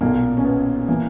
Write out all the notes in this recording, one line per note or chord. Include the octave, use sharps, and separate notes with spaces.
B1 A#2 A#3
C#4
B3
E3 A#3